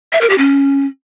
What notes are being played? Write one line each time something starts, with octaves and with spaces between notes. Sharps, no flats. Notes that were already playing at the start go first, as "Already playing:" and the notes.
E5
A#4
G4
C#4